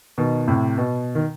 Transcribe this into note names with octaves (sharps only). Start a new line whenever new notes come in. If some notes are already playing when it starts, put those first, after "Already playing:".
B2 D#3
A2 C3
B2
D#3